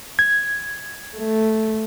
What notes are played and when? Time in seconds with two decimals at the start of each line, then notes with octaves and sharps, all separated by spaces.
0.19 G#6
1.16 A3